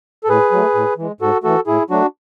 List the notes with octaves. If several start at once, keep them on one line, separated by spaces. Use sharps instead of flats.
A4
A2 G#4 B4
F#3 A3
A2
E3 G#3
G#2 F#4 A4
E3 A3 F#4 A4
A2 E4 G#4
F#3 A3 D4 F#4